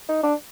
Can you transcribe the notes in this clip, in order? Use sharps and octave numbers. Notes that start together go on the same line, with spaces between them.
D#4
D4